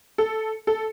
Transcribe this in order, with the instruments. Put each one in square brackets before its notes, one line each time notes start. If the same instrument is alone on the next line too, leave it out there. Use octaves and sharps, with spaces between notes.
[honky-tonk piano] A4
A4